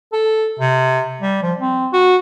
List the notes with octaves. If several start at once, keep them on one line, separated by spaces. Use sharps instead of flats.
A4
C3
G3
F3
C4
F#4